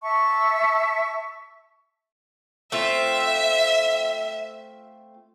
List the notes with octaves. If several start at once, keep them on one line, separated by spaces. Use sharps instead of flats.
E5 A5 C#6
A3 C4 F4 E5